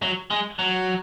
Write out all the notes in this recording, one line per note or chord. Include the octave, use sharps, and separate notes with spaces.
F#3
G#3
F#3